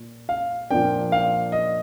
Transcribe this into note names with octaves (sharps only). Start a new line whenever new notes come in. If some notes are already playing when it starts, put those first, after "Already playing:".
Already playing: A#2
F5
A#2 F3 A#3 D4 G5
F5
D#5